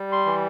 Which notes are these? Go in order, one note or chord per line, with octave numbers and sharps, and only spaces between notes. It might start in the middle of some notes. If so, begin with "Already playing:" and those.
Already playing: G3
C6
E3